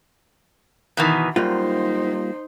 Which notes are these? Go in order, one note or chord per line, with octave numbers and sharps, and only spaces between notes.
B2 D#3 E3
F#2 G3 A#3 D#4 F4 C5